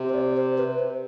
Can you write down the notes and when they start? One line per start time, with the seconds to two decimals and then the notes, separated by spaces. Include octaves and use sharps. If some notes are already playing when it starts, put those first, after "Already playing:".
Already playing: C3
0.09 C5
0.14 D5
0.36 C5
0.57 B4
0.78 C5